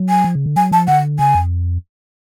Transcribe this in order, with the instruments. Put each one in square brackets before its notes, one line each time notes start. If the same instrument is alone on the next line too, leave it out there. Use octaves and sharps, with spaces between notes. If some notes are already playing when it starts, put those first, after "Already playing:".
Already playing: [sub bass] F#3
[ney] G#5
[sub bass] F3
C#3
D3
[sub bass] F#3 [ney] G#5
[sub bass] F3 [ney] A5
[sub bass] D3 [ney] F#5
[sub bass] C#3 [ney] G#5
[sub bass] F2